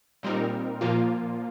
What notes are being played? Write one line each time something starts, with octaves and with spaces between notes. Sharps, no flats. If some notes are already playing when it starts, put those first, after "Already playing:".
A#2 G3 C4 D#4 A#4
A#2 F3 A#3 F4